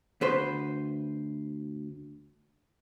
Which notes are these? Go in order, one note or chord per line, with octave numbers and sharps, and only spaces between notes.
D2 B4 C5